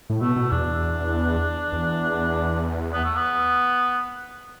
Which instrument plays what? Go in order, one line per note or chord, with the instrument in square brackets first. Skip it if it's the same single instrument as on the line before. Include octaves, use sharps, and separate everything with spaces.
[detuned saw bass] A2
[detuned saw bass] B2 [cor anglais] A3
[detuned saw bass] B2
[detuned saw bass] E2 [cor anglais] D4
[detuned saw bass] E2
[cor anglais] B3
A3
B3